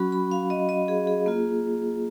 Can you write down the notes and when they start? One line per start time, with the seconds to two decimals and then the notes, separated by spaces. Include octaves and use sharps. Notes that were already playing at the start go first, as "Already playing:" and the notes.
Already playing: F#3 C#4 F#4 B5
0.12 B5
0.31 F5
0.50 D#5
0.69 D#5
0.88 G#4
1.07 G#4
1.26 A#3 F4